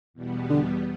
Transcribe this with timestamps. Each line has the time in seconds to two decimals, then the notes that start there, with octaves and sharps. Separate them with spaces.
0.14 E2 B2 G3 B3
0.50 D3